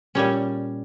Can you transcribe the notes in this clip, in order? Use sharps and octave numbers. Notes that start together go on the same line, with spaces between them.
A#2 G3 C#4